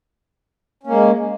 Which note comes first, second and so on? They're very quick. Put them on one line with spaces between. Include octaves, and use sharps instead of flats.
C#4 A#3 G#3